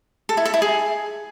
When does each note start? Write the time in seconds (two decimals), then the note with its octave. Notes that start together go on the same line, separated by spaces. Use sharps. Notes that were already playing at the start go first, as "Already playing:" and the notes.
0.29 A4
0.37 E4
0.45 A4
0.54 E4
0.62 G#4